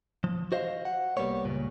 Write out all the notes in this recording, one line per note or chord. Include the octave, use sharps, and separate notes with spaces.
F3
F#4 C5 D#5 F5
F#5
C2 G3 A#3 B3 C#5
C#2 G2 A#2